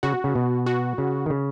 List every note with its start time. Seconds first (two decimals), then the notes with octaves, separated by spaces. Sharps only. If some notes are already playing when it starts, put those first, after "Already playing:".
0.03 C#3 F#4
0.24 C#3
0.36 B2
0.66 F#4
0.98 C#3
1.26 D#3
1.30 C#3